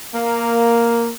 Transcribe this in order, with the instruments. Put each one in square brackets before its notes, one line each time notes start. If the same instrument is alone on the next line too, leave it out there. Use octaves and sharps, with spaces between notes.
[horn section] A#3